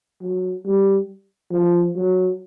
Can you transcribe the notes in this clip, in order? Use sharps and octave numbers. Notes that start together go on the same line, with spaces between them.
F#3
G3
F3
F#3